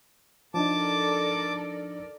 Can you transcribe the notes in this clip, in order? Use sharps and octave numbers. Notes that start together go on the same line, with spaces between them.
F3 D4 D#4 A4 A#4 D5 A5 D6